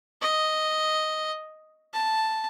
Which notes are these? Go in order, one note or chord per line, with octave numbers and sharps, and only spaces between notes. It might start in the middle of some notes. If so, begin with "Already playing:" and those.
D#5
A5